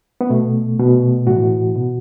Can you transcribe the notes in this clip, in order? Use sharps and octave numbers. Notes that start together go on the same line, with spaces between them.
B3
B2 A3
B2
A2 E3 F#4
B2